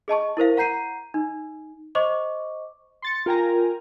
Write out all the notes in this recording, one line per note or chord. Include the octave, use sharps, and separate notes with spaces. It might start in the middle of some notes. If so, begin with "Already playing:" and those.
G#4 D#5 A5 C#6
E4 A#4 C5 F5
F#5 A#5 G6 C7 D#7
D#4
C5 D#5 C#6 D6
C6 A6 C#7
F4 A#4 G5 G#5 A#5